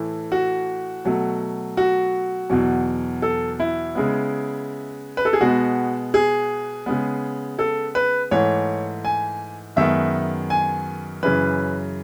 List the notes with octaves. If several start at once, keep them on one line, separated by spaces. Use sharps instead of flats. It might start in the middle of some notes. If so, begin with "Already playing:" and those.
Already playing: A2 E3 A3
F#4
B2 F#3 A3
F#4
E2 B2 F#3
A4
E4
C#3 G#3 B3
B4
A4
G#4
B2 G#3 B3 F#4
G#4
C#3 G#3 B3
A4
B4
G#2 E3 A3 C#5
G#5
F#2 D#3 G#3 B3 E5
G#5
F#2 C#3 E3 B4